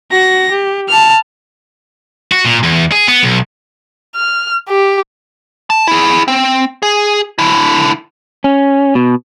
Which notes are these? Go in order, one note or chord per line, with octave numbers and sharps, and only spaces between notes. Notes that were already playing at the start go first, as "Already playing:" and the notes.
F#4 A#6
G4
A5 F6
F#4
A#2
E2
G#4
B3
B1
F6
G4
A5
E4 G#4
C4
G#4
D3 E4
C#4
B2